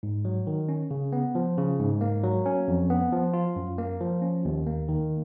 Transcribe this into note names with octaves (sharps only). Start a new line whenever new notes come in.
G#2
F#3
D#3
C#4
C#3
B3
F3
C#3
G#2
A#3
F#3
C#4
F2
B3
F3
F4
F#2
A#3
F3
C#4
D#2
A#3
D#3